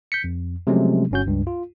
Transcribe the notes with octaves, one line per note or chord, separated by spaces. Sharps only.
G6 B6 C#7
F2
C3 F3 F#3 G#3 A3 C#4
G1 G2 C#4 F#4 G6
C#2 G2
F4